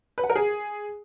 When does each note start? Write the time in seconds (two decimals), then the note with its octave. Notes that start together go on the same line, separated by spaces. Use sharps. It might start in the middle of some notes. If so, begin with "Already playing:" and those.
0.18 B4
0.24 F#5
0.30 A#4
0.36 G#4